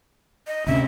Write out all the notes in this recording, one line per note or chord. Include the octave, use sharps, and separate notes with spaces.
D#5
D2 C3 C#4 E5